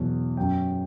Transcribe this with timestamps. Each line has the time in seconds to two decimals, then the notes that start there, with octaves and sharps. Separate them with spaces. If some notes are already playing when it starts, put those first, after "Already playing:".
Already playing: E2 B2 F#3
0.37 F#2 F#3 G5